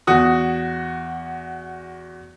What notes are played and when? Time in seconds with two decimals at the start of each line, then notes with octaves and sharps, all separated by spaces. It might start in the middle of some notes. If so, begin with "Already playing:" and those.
0.07 E2 F#4 D#6